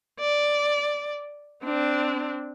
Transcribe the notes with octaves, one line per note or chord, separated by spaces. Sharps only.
D5
C4 D4